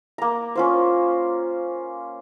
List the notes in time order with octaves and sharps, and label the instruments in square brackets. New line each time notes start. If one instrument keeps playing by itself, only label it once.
[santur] A#3 A#5
C#4 F4 C5